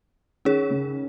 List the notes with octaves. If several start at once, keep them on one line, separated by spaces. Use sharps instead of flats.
D#3 C#4 G#4 C#5
C#3